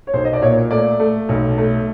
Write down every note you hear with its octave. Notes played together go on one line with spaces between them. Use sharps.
C#5
B1 C5
D#5
D5
A#2 C#5
A3 D5
A3
B1
A3